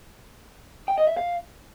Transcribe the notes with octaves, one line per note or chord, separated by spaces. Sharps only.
G5
D#5
E5
F5